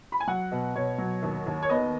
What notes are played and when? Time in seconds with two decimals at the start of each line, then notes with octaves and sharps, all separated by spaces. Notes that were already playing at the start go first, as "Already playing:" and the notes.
0.12 B5
0.20 G#5
0.27 F#3 F#5
0.52 B2
0.75 B2 C#5
0.98 F#3
1.23 D#2
1.46 D#2
1.63 C#5
1.70 B3 D#5